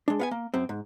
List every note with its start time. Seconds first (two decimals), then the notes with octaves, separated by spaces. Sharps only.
0.08 G#3 D4
0.19 B3 F5 G#5
0.31 A#3
0.54 F#2 C4
0.69 G#2